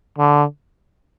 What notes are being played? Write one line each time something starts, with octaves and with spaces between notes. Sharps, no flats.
D3